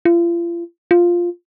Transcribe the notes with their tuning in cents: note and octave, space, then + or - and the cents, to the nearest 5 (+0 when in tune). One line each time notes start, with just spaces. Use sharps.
F4 -40
F4 +0